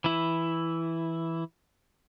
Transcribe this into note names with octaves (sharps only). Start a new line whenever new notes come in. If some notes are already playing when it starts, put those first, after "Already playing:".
E3 E4